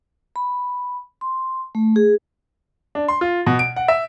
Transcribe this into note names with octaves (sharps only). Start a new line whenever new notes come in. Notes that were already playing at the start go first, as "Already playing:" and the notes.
B5
C6
A3
G#4
D4
C6
F4
B2
D7
F#5
E5